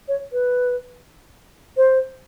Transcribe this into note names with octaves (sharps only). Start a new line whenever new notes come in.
C#5
B4
C5